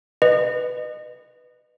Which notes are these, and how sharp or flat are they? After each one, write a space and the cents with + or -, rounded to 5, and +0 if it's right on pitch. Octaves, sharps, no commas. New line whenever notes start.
B4 +5 D#5 -30